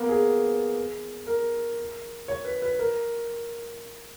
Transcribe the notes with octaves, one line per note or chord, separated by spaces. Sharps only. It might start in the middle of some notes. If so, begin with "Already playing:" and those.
Already playing: A#3 B3
G#4
A#4
C#5
B4
B4
A#4